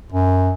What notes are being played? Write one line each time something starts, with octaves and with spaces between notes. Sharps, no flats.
F#2